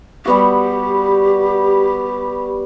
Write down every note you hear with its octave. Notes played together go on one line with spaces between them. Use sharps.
G3 B3 F#4 G4